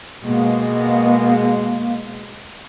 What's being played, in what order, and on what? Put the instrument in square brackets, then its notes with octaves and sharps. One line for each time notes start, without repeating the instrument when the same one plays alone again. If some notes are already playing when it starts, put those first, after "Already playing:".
[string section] B2 G#3 [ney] A#3